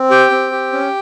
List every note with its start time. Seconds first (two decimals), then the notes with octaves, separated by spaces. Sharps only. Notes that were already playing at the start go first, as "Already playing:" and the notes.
Already playing: C4
0.10 G4 G5
0.31 C4
0.52 G4
0.72 C#4